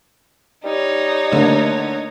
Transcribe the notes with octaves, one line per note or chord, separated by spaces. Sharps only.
G3 D#4 C#5
D3 A3 A#3